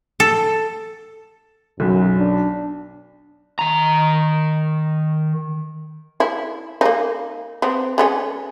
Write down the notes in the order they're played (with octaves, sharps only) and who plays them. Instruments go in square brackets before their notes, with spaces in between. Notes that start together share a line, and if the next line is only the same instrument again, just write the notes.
[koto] A4
[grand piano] B1 [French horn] F#2
[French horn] D4
[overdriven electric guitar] D#3 A#5
[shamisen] E4
A#3 D#4
B3 C4
G#3 B3 C#4